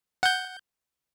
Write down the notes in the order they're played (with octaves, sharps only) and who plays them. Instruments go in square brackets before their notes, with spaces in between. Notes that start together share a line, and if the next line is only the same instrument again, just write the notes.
[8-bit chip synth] F#5 G6